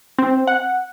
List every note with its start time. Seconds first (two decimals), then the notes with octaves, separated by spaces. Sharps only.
0.18 C4
0.47 F#5